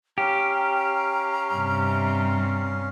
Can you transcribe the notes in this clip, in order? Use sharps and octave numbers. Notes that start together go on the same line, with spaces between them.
C#4 G4 F5 A#5
G2 C3